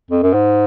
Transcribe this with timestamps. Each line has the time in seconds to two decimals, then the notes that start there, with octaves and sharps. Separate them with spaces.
0.11 F2
0.23 F#2
0.34 G#2